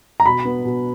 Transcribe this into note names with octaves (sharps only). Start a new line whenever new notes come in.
A#5
B2 B5
B3
B2